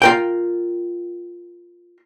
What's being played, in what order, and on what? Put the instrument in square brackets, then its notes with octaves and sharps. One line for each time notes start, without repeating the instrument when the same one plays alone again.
[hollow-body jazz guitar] F4 A#4 G5